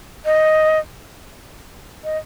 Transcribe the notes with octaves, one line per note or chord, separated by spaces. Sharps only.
D#5
D#5